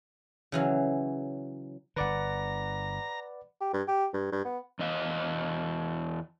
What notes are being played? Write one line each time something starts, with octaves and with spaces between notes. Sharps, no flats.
C#3 E3 F#3
G1 D3 B4 D5 F#5 A#5
G4
G2
G4
G2
G2
B3
E2 D#5 F5